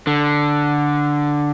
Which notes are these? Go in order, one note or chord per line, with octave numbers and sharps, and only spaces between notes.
D3